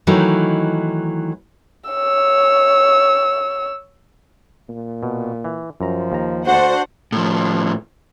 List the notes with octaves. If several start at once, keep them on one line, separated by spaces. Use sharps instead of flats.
D#3 E3 F#3 A3 D#4
C#5 E6
A#2
B2
E3
F#2 F3 A#5
D#2 A#5
D2 D4 F#4 C5 F#5
A2 F3